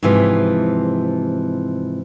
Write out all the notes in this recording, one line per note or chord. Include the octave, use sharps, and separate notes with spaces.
G#2 C3 E3 F3